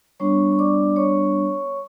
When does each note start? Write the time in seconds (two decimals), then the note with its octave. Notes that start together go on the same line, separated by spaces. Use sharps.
0.20 G3 B3 D4 C#5 C#6
0.52 C#6
0.59 D5 D6
0.96 C#5 C#6